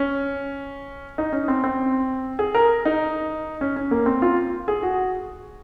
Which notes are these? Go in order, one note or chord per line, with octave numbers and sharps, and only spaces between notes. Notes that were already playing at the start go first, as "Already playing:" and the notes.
Already playing: C#4
D#4
C#4
C4
C4
G#4
A#4
D#4
C#4
C#4
A#3
C4
F4
G#4
F#4